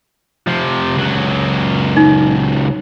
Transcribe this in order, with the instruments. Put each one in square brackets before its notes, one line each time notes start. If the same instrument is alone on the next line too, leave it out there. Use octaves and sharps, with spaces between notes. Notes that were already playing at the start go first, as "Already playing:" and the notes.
[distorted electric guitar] C3 F3
C#2 F#3
[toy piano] D#4